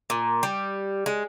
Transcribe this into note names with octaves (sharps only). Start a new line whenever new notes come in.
A#2
G3
G#3